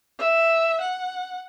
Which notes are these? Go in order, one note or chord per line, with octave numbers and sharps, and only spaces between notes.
E5
F#5